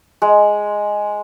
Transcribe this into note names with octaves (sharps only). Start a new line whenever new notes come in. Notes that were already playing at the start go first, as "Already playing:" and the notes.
G#3